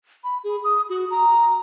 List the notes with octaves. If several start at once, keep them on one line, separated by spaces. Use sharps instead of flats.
B5
G#4
D#6
F#4
A#5